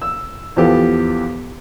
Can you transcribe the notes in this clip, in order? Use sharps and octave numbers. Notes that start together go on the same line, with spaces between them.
E6
E2 F3 B3 G4 A4